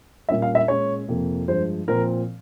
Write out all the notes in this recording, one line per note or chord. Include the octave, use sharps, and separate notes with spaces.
A#2 G3 A#3 C#4 E5
F5
E5
A#2 G#3 C#4 C#5
F2 C3 F3 A#3
G2 F3 G#3 C5
A#2 F3 C4 A#4